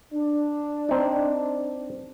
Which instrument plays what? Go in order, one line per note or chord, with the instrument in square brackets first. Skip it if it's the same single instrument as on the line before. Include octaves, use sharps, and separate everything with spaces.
[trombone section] D4
[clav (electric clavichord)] C4 D#4